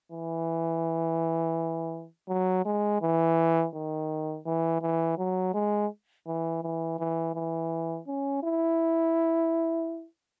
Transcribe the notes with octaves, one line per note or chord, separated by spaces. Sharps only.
E3
F#3
G#3
E3
D#3
E3
E3
F#3
G#3
E3
E3
E3
E3
C#4
E4